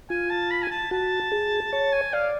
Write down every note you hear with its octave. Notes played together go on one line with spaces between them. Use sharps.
F4 G#5
A5
B5
G#5
A5
F#4 A5
G#4
C#5 A5
G#5
D5 F5